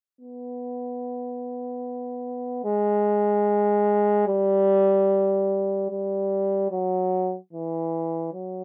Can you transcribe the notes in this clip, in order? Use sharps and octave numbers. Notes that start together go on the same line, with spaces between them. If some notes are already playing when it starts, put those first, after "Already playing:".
B3
G#3
G3
G3
F#3
E3
F#3